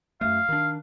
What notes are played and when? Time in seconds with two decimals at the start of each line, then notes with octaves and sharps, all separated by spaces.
0.21 F#2 A3 F5
0.49 D#3 D4